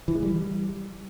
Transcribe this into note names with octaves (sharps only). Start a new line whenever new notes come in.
E3
G#3
G3